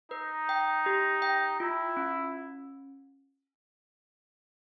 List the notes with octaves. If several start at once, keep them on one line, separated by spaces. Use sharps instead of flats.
D#4 B4
G5
G4
G5
E4 F4
C#4